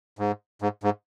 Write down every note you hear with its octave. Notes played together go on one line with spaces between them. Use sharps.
G#2
G#2
G#2